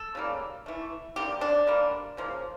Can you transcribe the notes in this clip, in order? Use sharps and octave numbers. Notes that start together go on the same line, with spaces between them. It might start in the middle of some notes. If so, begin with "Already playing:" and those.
Already playing: A4
C#3 G3 A#3
E3 A3
D3 G3 A#3 G4
D4
D3 G3 A#3
C#3 F3 A#3